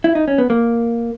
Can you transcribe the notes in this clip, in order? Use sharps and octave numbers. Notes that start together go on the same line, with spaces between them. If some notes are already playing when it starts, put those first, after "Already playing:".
E4
D#4
C#4
B3
A#3